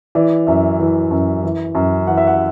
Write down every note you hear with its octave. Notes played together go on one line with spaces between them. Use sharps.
E3 D5
F#2 E5
E3
F#2
E3
F#2
E3 F#5
E5
F#5